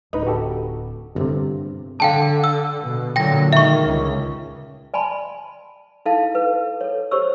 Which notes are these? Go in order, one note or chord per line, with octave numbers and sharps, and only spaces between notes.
D1 D#4 B4 D#5
F#4 G4 A4
G1 G2 C3 D4
D3 F5 G5 A5
E6
B2
A#2 D3 F#3 G5 A#6
D#3 G#3 E5 C#6
C#2
D5 G#5 A5 B5 C6
D#4 E4 A4 F5 A5
A4 B4
A4 C#5
G4 C5 C#5 C#6 E6